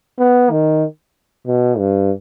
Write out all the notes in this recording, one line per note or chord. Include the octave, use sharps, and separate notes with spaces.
B3
D#3
B2
G2